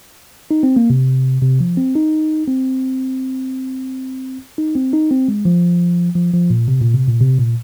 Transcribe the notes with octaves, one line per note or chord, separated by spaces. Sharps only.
D#4
C4
A#3
C3
C3
F3
C4
D#4
C4
D#4
C4
D#4
C4
G#3
F3
F3
F3
A#2
C3
A#2
C3
A#2
C3
A#2